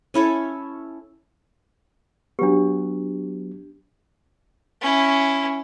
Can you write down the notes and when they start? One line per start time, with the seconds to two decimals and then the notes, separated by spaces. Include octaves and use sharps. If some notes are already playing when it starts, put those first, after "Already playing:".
0.14 C#4 E4 A4 C#5
2.39 F#3 B3 D4 G4
4.81 C#4 E4